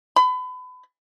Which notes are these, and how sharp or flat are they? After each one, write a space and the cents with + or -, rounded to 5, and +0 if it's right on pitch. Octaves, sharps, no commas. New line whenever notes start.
B5 +30